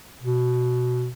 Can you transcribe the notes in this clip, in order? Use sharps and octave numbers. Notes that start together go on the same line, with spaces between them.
B2